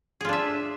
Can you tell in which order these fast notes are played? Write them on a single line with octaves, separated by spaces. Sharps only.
G#4 F4 D4 E5